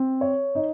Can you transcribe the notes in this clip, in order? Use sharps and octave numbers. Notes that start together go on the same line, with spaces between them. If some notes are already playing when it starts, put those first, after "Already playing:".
Already playing: C4
C#5
D#4